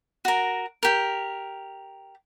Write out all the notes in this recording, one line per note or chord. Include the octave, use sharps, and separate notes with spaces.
F#4 A#4
G4 A#4